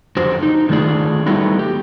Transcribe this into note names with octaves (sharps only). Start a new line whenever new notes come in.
F2 D3 F#4 G4 C5
D#4
D3 D#3 A3 F4 G#4 D5
G3 A3 B3 D#4 E4 F#4
G4